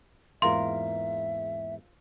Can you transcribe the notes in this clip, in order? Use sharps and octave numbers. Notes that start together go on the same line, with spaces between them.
E2 G#2 A#3 F4 A#4 E5 C6